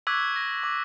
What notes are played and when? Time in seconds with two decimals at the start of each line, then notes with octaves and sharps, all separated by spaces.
0.07 C#6 D6 E6 F#6 G#6 B6
0.36 A#6
0.63 D6